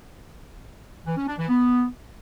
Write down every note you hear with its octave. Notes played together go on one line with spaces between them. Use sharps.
E3
C#4
D4
E3
B3